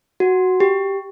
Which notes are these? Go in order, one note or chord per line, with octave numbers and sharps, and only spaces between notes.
F#4
G4